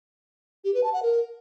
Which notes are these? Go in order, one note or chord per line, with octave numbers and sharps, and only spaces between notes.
G4
B4
A5
F#5
A#4